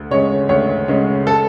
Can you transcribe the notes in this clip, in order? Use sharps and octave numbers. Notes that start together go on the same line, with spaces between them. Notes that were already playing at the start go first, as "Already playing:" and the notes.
Already playing: D2
C#3 G#3 C#4 C#5
D2 C#5
C#3 G#3 C#4
A4